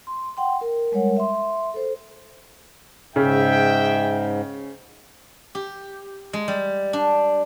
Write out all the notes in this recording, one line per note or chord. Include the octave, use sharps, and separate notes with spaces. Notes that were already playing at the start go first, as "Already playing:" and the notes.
C6
F#5 G5 C6
A#4
G3 G#3 A#4 C#5 F#5
E5 C6
A4 C5
G#2 C#3 G#4 E5 G5
G4
G#3
G3
D4